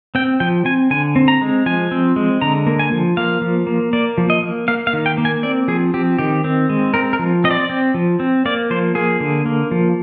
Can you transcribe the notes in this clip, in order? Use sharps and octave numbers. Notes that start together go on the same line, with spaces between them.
C4 G5
F3 G5
C4 G#5
D3 G#5
C4
A#5
G#3
F3 G#5
C4
G#3
D3 A#5
A#3
G#5
F3
A#3 F5
F3
A#3
A#3 D5
F3
D#5
A#3
A#3 F5
F5
D#3
G5
A#3
G#5
C4 D5
F3 G#4
C4 G4
D#3 G4
C4
G#3
C4 A#4
A#4
F3
C4 D#5
D5
C4
F3
C4
A#3 D5
F3 C5
A#3 G#4
D3
A#3
F3